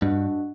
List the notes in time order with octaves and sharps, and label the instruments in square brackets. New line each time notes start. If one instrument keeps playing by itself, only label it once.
[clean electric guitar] G2 [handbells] D4 F#4 B4 D#5 F#5